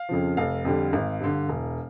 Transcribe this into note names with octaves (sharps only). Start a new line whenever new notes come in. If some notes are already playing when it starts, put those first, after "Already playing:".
Already playing: F5
F2 C#3 F3
F1 F5
F2 D3 G3
G#1
G2 D3
E1